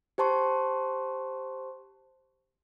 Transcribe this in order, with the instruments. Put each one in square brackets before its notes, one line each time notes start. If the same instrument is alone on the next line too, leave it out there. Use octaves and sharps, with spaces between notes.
[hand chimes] G4 C5 A5 C6 C#6